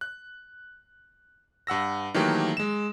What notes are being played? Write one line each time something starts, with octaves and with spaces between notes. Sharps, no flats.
F#6
G2 F#5 E6 A#6
D#3 E3 F#3 A3 A#3 G4
G#3 E7